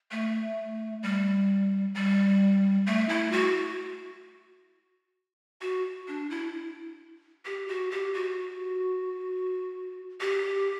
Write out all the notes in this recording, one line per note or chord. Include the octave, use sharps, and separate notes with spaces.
A3
G3
G3
A3
E4
F#4
F#4
D4
E4
G4
F#4
G4
F#4
G4